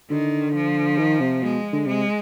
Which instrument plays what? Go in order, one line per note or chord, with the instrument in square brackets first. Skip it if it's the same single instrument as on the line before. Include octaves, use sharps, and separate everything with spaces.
[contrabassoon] D3 [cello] D#3
[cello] F3
[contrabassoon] D#3
C3
[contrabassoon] B2 [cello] G#3
[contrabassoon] D3
[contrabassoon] C3 [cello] G#3